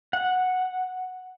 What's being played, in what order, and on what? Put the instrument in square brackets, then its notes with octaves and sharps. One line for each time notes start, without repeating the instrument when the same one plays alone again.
[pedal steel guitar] F#5